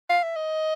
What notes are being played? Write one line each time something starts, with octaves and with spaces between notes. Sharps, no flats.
F5
E5
D#5